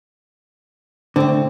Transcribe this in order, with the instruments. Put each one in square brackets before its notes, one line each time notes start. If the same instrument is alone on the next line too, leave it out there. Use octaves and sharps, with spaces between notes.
[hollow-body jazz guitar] A2 D3 [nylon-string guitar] C4